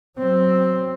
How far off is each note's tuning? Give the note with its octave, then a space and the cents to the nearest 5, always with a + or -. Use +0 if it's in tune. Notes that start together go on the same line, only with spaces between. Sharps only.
F#3 +0 C4 +0